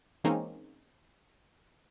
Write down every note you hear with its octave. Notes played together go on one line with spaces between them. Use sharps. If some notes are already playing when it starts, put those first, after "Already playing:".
E3 G#3 A#3 C4 C#4 D#4